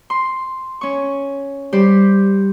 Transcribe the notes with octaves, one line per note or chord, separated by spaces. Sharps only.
C6
C#4 C#6
G3 G4 C5